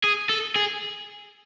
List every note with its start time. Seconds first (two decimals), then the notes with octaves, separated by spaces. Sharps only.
0.04 G#4
0.30 A4
0.56 G#4